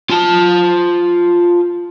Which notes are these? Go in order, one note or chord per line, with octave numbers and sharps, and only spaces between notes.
F4 A5